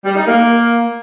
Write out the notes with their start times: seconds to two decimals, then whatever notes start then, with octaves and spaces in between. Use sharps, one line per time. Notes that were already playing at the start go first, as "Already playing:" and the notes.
0.05 G3
0.16 D#4
0.27 A#3